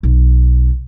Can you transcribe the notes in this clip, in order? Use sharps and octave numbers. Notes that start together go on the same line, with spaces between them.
B1